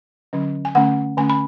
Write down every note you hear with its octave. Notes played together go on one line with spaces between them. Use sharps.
D3 F#3 C#4
G#5
D3 A3 C#4 F#5
D3 A3 C#4 G#5
B5